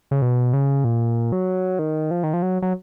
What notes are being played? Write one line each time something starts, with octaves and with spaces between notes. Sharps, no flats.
C#3
B2
C#3
A#2
F#3
D#3
F3
D#3
F3
F#3
F#3